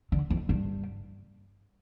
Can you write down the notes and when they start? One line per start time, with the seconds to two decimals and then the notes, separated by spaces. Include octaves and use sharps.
0.12 D3
0.30 F2
0.49 G2